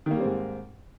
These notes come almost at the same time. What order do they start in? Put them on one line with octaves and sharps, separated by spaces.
D#3 A#3 G3 C4 G#2